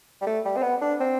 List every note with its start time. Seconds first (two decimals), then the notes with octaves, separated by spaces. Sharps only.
0.21 G3
0.26 A3
0.45 G3
0.57 C4
0.62 B3
0.82 D4
1.00 C4